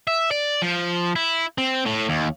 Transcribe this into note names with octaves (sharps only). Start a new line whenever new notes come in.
E5
D5
F3
E4
C4
A2
D#2